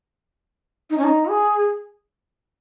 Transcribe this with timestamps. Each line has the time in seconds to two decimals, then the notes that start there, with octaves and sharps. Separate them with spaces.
0.90 D#4
0.98 C#4
1.04 D#4
1.29 G#4